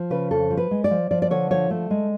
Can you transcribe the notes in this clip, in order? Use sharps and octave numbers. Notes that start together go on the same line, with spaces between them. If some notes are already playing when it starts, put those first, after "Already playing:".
Already playing: F3
C#3 B4
F2 A4
F3
B4
G#3
D5
F3
F3 D5
D5
D3 C#5
F3 C#5
A3
G#3